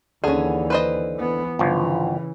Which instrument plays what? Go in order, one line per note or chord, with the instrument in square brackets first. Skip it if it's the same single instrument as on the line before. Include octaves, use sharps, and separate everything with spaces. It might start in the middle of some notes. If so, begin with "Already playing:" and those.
[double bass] D#2 E3 [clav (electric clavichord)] D3 [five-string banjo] C#4 G#4
[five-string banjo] B4 C5 D#5
[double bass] E3 B3
[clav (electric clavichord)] G1 F3 [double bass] C#3 E3